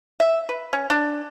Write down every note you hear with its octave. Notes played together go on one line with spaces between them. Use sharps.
E5
B4
C#4
D4